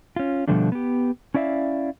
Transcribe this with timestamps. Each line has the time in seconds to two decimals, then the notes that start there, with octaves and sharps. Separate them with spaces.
0.16 C#4 F4
0.48 B2 D3 F3 G3 A3 D4
0.72 B3 G4
1.34 C#4 E4 D5 E5 F5